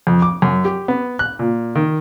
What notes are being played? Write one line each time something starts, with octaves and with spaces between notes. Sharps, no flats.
F2
D6
F#2
G4
B3
F#6
A#2
D#3